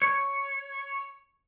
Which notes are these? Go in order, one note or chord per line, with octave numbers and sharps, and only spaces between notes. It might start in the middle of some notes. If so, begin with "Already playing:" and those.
C#5